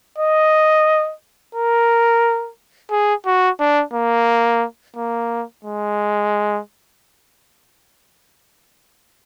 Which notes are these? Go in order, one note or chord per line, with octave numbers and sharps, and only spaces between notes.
D#5
A#4
G#4
F#4
D4
A#3
A#3
G#3